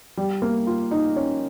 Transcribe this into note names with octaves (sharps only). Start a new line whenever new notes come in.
G3
A#3
F4
D#4
C#4